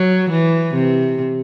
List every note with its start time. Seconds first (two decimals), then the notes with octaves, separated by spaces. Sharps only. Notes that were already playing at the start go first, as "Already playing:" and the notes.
Already playing: F#3
0.30 E3
0.74 C3